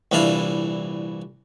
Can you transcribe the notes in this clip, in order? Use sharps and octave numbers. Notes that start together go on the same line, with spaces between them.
C2 A#2 E3 D4 E5 F5